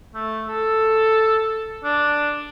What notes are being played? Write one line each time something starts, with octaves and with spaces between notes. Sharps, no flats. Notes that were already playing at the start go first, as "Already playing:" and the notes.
A3
A4
D4